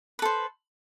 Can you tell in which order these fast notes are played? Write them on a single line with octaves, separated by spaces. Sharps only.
B4 A4 C5